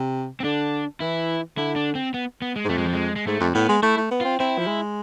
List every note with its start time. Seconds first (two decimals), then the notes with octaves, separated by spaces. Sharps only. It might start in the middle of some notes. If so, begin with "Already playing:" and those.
Already playing: C3
0.40 C4
0.44 D3 D4
1.00 E3 E4
1.57 D3 E4
1.76 D4
1.95 C4
2.14 B3
2.42 B3
2.56 G#3
2.65 G#2
2.69 F2 A3
2.78 G#3
2.86 F3
2.93 G#3
3.16 G#3
3.27 G#2 A3
3.41 F2
3.55 A2 B3
3.69 G#3
3.83 A3 E4
3.97 A3
4.11 B3
4.21 C4 F4
4.39 C4 E4
4.58 F3
4.67 G#3